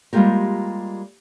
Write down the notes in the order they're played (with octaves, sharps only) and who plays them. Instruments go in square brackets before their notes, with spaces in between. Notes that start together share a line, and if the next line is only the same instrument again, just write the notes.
[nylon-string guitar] G3 G#3 A#3 F4 G4 A#4